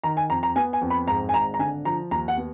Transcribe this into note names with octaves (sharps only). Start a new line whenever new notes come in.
D#3 A#5
G#5
F2 A#5
A#5
B3 G#5
G#5
F2
B5
G#2 A#5
G#5
G#1 A#5
A#5
D3 G#5
F3 A#5
D#2 A#5
F#5
B3